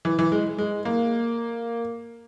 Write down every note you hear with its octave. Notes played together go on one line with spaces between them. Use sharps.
E3
E3
G#3
G#3
A#3